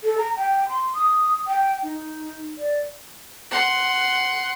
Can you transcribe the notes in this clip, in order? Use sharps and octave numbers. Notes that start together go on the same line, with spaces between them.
A4
A#5
G5
C6
D#6
G5
D#4
D5
F#5 C6